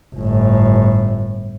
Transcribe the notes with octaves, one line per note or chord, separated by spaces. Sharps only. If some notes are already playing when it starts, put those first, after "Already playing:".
G1 A2